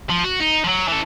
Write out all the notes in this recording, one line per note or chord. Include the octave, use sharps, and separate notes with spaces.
F3
F#4
D#4
F3 F#3
E3 A4